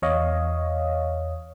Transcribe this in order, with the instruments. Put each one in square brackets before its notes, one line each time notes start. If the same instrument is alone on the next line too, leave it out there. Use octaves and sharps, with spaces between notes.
[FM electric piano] E2 C#5 D#5 F5